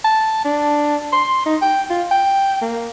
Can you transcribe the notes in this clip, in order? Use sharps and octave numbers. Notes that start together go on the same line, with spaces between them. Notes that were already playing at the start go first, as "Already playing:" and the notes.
A5
D4
C6
D#4
G5
F4
G5
A#3